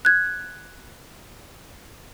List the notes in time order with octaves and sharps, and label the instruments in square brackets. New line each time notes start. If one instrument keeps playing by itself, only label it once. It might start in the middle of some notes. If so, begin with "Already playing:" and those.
[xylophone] F#6 G#6